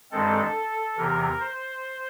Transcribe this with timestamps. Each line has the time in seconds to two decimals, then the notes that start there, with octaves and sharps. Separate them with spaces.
0.12 G2 D#3 G#3 C4 A4
0.97 E2 C3 E3 A#4
1.40 C5